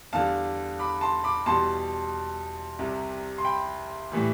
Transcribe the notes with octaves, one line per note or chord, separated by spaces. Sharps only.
E2 D3 G3 F5 A5
B5 D6
A5 C6
B5 D6
E2 B2 G3 A5 C6
C2 C3 G3
C6
G5 B5
A2 E3 G3